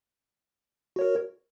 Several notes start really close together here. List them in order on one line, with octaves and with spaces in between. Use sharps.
F#4 C#5 A#4